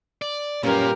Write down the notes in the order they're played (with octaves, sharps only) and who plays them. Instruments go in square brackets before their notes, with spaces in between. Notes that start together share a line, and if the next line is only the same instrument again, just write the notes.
[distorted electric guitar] D5
[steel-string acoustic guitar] F#2 C#4 [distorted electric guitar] A#2 A#3 [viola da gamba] G3 A#4 B4 [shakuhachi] G4